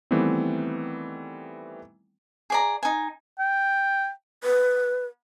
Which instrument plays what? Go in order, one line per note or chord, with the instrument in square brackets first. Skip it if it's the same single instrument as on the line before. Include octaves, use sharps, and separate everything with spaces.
[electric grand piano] D#3 E3 G3 A3 B3 C4
[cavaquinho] G#4 D5 A#5
D#4 G#5
[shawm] G5
[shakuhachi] B4